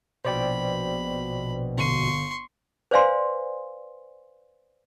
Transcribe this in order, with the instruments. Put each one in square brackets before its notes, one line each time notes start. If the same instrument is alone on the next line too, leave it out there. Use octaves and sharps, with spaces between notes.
[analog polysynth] A#1 B2 [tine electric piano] C5 D5 G5 [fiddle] B5
[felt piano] G1 D#7 [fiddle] C6 C#6
[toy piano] B4 C5 D5 F5 G#5 C6